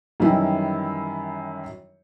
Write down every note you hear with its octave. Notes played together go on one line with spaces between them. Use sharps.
F#2 D#3 E3 G3 E4